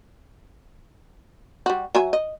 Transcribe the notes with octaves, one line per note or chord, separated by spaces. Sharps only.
G3 F#4
F#3 E5 G#5
D#5